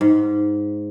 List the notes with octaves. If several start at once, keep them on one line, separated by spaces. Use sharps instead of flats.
G#2